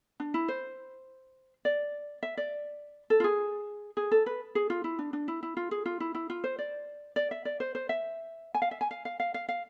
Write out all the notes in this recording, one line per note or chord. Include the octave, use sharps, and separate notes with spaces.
D4
E4
C5
D5
E5
D5
A4
F4
G#4
G#4
A4
B4
G#4
F4
E4
D4
D4
E4
E4
F4
G#4
F4
E4
E4
F4
C5
D5
D5
E5
D5
C5
C5
E5
G#5
F5
E5
G#5
F5
F5
F5
F5
F5